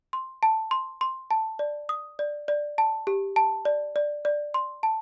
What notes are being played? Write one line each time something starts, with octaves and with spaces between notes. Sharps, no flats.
C6
A5
C6
C6
A5
D5
D#6
D5
D5
A5
G4
A5
D5
D5
D5
C6
A5